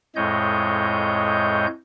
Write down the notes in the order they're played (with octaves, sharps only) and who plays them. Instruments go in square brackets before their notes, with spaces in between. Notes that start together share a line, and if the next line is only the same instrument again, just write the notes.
[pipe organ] F2 A2 G#3 C#5 D#5 G6